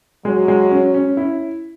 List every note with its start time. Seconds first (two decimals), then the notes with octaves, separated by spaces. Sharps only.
0.25 F#3 G#3
0.48 G#3
0.71 C#4
0.94 C#4
1.17 E4